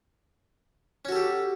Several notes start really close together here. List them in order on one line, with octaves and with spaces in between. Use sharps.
C#4 F#4 A4 G4